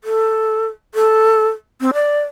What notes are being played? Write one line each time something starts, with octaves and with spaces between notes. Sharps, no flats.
A4
A4
C4
D5